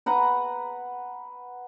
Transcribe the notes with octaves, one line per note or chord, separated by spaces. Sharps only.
B4 F#5 A#5